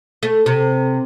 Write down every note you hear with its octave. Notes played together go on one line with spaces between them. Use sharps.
A3
C3